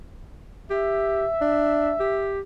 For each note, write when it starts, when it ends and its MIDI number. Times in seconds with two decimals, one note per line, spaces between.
0.70 1.25 67
0.70 2.36 76
1.41 1.93 62
2.00 2.40 67